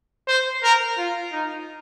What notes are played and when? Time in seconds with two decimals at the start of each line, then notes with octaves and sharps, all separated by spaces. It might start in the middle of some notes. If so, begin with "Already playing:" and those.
0.28 C5
0.63 A#4
0.98 F4
1.32 D#4